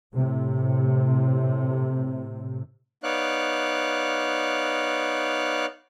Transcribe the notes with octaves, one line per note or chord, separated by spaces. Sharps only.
A2 C3
B3 D#4 C#5 D5 F5 F#6